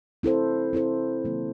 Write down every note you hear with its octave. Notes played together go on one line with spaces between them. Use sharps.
C4 E4 A4 C5
C4 E4 A4 C5
C3 D#3 F#3 A#3